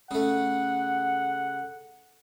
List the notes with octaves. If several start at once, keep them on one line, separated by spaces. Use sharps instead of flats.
C#3 A3 F#5